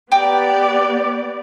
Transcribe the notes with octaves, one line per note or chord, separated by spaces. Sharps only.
B3 G4 D5 G5 A#5 D6